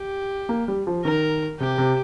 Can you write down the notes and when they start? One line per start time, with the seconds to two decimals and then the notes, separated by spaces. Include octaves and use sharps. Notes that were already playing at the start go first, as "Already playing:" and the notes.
Already playing: G4
0.49 A#3
0.68 G3
0.87 F3
1.05 D#3 A#4
1.60 C3 G4
1.78 C3